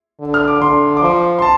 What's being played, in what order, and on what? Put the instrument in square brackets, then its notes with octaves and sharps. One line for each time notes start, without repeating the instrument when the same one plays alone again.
[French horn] D3
[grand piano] F6
D6
[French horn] D3 [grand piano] C6
[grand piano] D6
[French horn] F3 [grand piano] C6
[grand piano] C6
A5